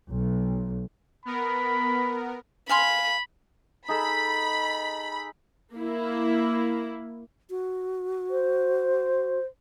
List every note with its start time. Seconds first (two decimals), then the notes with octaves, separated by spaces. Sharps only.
0.11 B1
1.25 B3 A#4 B5
2.69 F5 G#5 B5 C6
3.88 D#4 G#4 A4 B5
5.74 A#3 E4
7.50 F#4
8.30 C5